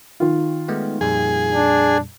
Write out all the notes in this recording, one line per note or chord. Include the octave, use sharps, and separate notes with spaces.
D#3 F4
G#3 A3 B3
F2 A#2 G3 G#4
D4